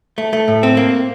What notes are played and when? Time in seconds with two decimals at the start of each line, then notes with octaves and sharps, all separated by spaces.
0.18 A3
0.33 A3
0.48 A2
0.63 C4
0.77 A#3